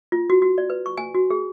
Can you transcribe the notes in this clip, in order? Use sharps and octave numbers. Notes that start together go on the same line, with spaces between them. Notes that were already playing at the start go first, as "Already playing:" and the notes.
F4
F#4
F#4
D5
B4
C#6
G#5
F#4
G#4